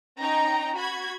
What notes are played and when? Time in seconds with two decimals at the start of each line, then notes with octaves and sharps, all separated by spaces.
0.19 C#4 D#4 G5 A#5
0.77 F#4 B5 G#6